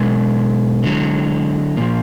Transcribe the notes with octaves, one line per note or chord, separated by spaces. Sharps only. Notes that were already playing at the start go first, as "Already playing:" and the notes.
Already playing: B2 F#3 G#3
D3 F#3
A#2 F3 A#3